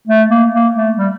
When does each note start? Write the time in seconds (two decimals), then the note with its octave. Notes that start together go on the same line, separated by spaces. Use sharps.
0.08 A3
0.30 A#3
0.53 A#3
0.75 A3
0.98 G3